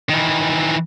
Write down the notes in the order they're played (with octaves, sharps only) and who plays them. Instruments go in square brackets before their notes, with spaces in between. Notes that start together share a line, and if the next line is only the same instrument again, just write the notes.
[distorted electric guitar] D#3 E3